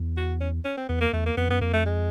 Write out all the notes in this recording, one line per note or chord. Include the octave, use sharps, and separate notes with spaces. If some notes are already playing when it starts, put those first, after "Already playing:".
Already playing: E2
F#4
C#4
C#4
C4
E2 B3
A#3
E2 A3
A#3
F2 B3
F#2 B3
F2 A#3
A3
G#3